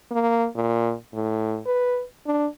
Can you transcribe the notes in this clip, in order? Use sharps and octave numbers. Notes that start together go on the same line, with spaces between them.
A#3
A#2
A2
B4
D4